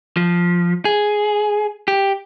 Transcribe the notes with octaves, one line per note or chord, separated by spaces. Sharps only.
F3
G#4
G4